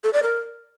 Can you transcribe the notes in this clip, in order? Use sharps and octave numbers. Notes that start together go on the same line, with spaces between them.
A4
D5
A#4